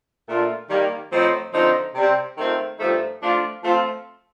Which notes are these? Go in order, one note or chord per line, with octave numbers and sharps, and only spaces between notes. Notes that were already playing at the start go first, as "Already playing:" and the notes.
A#2 A3 D4 F4
D#3 G3 A#3
A2 F3 C4 D#4
D3 F3 C4 D#4
C3 G3 C4
D#3 A3 C4 F4
G2 F3 A3 D#4
F3 A3 D4 F4
F3 A3 C4 F4